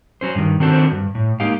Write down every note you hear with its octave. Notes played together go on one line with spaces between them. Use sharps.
F#3 C#4 C5
G2 D#3
D#3 C4 D4 F#4 A4 C5
G2
A2
G#3 A#3 D#4 G4 F5